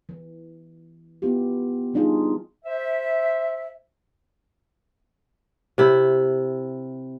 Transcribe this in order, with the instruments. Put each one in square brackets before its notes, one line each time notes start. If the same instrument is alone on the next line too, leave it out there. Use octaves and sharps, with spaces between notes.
[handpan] E3
B3 E4 F4 G4
E3 G3 D4 D#4 F4 G#4
[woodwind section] C5 E5
[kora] C3 E4